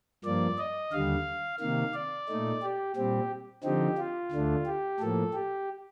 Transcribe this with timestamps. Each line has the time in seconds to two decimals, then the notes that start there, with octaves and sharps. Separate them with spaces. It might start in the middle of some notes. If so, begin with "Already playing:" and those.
0.24 G2 F3 A#3 D5
0.58 D#5
0.92 D#2 D3 G3 F5
1.60 C3 D#3 A#3 F5
1.94 D5
2.28 A#2 A3 D#4
2.62 G4
2.95 A#2 G3 C4 G4
3.64 D3 F3 C4 D#4 G4
3.98 F4
4.31 D2 D3 A3 D4
4.66 G4
5.00 A2 F3 A#3 A4
5.33 G4